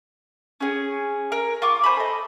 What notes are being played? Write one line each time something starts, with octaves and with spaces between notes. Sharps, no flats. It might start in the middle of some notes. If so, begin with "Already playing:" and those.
C#4 G#4
A#4
F4 C#6 D6
C5 G#5 B5
A4 D#5